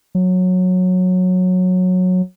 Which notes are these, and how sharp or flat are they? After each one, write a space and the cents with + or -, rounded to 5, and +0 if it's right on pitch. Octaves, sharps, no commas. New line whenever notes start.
F#3 -15